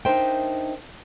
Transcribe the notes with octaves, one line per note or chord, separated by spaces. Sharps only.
D4 D#4 A#4 C5 E5 G5